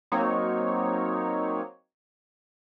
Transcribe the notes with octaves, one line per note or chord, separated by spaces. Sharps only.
F#3 A#3 C4 D#4 C#5